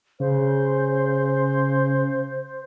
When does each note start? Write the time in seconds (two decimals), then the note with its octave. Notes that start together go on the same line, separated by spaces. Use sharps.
0.20 C#3 C5